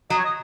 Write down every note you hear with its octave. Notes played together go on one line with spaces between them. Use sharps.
F#3 D#5
C#5
D#5